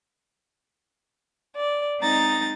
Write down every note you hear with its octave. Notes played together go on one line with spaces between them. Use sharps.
D5
G#3 C4 D#4 A#5 A6